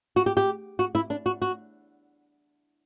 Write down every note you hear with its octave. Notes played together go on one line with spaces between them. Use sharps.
F#4
G4
G4
F#4
E4
D4
F#4
F#4